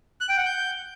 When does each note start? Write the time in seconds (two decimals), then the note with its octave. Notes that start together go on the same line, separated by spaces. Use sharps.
0.21 F#6
0.29 G5
0.37 F#5
0.45 G6